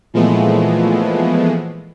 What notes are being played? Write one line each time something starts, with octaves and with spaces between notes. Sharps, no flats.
A#2 E3 F3 G#3 A3 B3